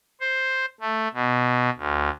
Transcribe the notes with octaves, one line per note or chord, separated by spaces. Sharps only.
C5
A3
B2
D2